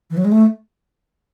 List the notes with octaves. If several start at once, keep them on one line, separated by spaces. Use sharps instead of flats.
E3
F#3
G#3
A3